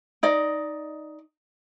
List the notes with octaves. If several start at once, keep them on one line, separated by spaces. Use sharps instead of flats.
D#4 D5 D#5